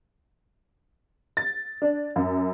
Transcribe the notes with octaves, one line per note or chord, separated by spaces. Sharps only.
A6
D4
F#2